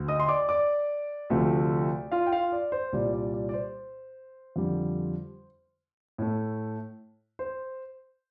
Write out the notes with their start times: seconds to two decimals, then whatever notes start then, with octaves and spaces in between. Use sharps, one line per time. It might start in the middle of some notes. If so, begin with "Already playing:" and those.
Already playing: D2
0.08 D#5 D#6
0.20 C6
0.28 D5 D6
0.49 D5 D6
1.30 D2 C3 F3 A3
2.12 F4 F5
2.26 G5
2.32 F4 F5
2.52 D5
2.72 C5
2.93 C2 A#2 G3 D5
3.13 D5
3.34 D5
3.49 D5
3.54 C5
4.56 F2 D3 G3
6.18 A2 A3
7.39 C5